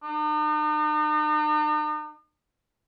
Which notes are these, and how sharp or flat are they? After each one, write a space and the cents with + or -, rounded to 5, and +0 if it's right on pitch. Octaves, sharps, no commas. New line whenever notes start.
D#4 -45